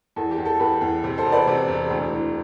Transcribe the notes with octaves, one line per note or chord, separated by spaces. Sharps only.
E2 A4
G4
E2
A4
E2 G4 B4
E2
C3
A4 C5
E1
B4 D5
C3
E1
D2
E3